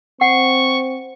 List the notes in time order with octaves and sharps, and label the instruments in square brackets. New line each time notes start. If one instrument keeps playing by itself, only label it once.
[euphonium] C4 [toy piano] F#5 [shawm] C#6